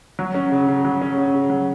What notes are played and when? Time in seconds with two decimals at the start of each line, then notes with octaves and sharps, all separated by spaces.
0.19 F#3
0.34 C#4
0.52 C#3
0.68 C#3
0.85 F#3
1.02 C#4
1.18 C#3
1.34 C#3
1.50 F#3